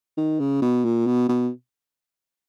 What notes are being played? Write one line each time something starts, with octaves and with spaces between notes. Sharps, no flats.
D#3
C#3
B2
A#2
B2
B2